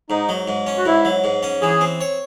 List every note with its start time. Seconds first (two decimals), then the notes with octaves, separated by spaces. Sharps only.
0.10 G#2 D#4
0.29 F#3
0.48 G#2
0.67 C#4
0.77 F#4
0.85 G#2 E4
1.05 F#3
1.24 G#2
1.43 C#4
1.62 E3 G#4
1.81 C4
2.01 C#5